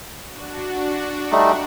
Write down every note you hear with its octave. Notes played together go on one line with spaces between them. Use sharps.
D4 F#4
G3 A3 D#4